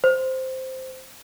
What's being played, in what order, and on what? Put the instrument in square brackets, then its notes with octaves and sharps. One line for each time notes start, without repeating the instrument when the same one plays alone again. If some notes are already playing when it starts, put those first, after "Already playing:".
[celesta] C5